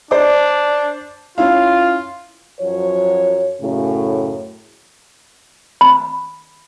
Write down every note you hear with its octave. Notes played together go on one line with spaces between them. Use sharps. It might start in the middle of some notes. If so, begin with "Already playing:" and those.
D4 C5 D5 D6
C#4 E4 F4 F5
F#2 F3 F#3 C#5
F#2 A2 C#3
B5